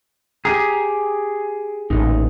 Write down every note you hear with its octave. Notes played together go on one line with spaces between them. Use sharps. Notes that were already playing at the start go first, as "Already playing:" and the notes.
G4 G#4 A#5
A1 A#2 D#4